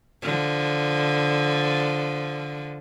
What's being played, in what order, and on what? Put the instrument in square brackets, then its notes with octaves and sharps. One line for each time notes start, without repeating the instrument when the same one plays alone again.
[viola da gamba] D3 F3